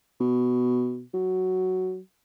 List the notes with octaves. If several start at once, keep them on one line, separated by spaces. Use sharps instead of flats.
B2
F#3